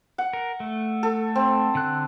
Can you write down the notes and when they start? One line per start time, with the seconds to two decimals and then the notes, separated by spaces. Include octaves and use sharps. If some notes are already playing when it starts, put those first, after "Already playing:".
0.18 F#5
0.33 A#4
0.60 A3
1.03 A4
1.35 C4
1.75 D3 F#6